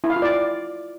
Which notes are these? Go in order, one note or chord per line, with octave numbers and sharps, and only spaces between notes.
E4
F5
F4
D5